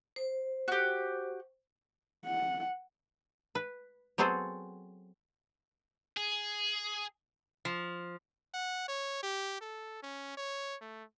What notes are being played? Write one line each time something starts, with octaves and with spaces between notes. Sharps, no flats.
C5
F#4 G4
F#5
B4
F#3 B3 C4 G#4 A4 C5
G#4
F3
F#5
C#5
G4
A4
C#4
C#5
A3